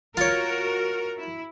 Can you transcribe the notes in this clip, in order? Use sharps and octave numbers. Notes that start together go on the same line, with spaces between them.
F4 F#4 A#4 C#5
E4